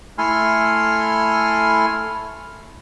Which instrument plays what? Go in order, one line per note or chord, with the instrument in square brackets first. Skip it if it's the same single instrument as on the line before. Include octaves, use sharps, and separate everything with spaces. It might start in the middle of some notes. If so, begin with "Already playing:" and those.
[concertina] A3 E4 A4 G#5 C6 F6